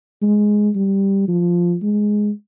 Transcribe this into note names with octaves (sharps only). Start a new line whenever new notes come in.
G#3
G3
F3
G#3